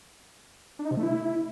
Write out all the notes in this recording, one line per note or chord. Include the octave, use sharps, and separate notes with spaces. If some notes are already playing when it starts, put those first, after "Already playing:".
D4
D#4
C3
A3
E4